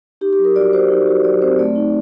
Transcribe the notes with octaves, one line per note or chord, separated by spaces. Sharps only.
D#4 G4
G4
F#3
A#4
F#4 D5
F#4 C5
D#4
F#4
F#3 D5
C4 C5
A3 D5
D#4